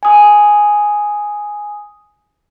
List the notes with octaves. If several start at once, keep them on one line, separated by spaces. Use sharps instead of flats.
G#5 D#6